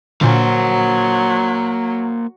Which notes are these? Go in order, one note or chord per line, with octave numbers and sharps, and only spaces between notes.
A#2 D3 F#3 A#3 C5